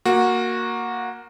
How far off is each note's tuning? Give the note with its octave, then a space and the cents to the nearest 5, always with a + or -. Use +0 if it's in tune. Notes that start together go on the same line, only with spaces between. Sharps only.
A#3 +0 F#4 -15